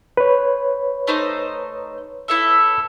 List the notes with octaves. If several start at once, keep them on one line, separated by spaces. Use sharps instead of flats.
B4 C#5
A3 D#4 C5
E4 A4 E5